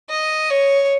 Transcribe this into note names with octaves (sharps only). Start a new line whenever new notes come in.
D#5
C#5